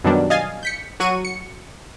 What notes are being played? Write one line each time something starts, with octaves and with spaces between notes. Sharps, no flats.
F#2 B2 D#3 F#3 G3 D4
D#5 F5 G#5 A6 C7
G6 B6 C#7
F#3 F#4 C#6 D#7
C#7